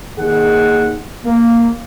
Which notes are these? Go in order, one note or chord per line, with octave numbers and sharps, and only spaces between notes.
D#2 D#3 G#4 F#5
A#3